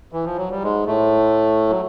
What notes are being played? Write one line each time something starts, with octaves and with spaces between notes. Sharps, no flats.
E3
F3
F#3
G3
G#2 G#3
A2 A3
F#3